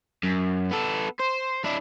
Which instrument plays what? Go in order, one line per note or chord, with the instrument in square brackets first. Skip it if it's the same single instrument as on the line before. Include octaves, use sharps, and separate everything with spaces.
[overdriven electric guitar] F#2
B3 A4
C5
D4 E4